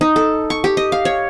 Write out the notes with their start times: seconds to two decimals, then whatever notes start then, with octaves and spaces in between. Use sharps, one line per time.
0.01 D#4
0.16 A4
0.50 C#6
0.64 G4
0.77 D#5
0.92 F5
1.05 C#5